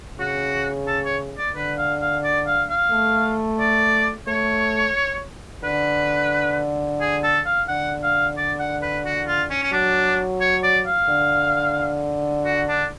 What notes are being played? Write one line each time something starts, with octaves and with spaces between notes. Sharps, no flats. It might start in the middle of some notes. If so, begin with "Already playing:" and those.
C#3 F#4
A4
C#5
D5
D3 B4
F5
F5
D5
F5
F5
A3
D5
A3 C#5
D3 B4
G#4
A4
F5
D3 F#5
F5
D5
F#5
B4
F#4
F4
C#4
C#4
F#3 D4
C#5
D5
F5
D3
F#4
D4